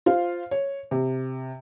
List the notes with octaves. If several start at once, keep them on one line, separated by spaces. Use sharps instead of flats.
F4 C5 F5
C#5
C3